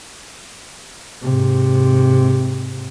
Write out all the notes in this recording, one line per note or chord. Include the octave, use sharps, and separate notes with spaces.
G#2 C3